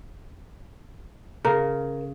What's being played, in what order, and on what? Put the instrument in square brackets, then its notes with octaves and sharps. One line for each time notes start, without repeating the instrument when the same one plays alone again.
[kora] C#3 [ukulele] A#4